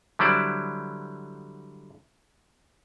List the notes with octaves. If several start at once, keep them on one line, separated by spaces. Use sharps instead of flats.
D3 F#3 G3 E4 C5 D5